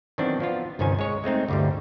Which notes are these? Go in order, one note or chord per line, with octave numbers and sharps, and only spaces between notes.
D#3 E3 F#3 B3 C4 D4
F3 B3 F4
G1 C2 D#3 C#4 C5 G#5
G#3 C#5
G#3 A3 C4 D#4
D2 G2 D3 E3 G3